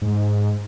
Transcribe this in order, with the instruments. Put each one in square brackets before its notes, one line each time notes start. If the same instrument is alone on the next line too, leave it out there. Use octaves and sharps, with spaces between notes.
[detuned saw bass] G#2